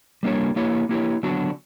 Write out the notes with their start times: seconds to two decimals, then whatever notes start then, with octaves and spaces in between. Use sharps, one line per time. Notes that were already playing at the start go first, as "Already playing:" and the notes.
0.23 G3 A#3 D4 G4 C#5
0.56 A#3 E4 G4 C#5
0.89 A#3 E4 G4 C#5
1.23 D3 F#3 B3 D4 F#4